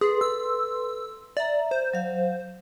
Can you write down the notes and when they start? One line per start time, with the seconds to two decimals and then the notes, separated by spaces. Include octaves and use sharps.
0.01 G#4 A4 B4 C6
0.21 E6
1.37 D5 E5 A#5
1.71 C5
1.93 F#3 F5